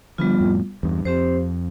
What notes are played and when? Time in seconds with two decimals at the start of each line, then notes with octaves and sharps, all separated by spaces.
0.18 D3 F3 G3 B3 F4
0.40 F2 A2
0.83 E2 G2
1.05 F2 C4 G4 C5